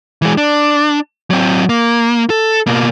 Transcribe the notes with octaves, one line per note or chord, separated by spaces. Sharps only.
E3 G#3
D4
F#3 C4
A#3
A4
B2 A#3